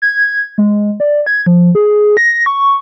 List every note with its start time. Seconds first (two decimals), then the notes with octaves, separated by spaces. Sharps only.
0.02 G#6
0.58 G#3
1.00 D5
1.26 G#6
1.46 F3
1.75 G#4
2.17 A#6
2.46 C#6